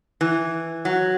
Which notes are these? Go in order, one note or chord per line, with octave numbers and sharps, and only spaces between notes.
E3
F#3